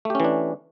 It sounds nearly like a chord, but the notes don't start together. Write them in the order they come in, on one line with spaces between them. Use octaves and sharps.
A3 G4 C#4 E3 D4